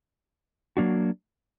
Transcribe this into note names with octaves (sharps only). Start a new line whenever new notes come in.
F#3 A#3 D4 F#4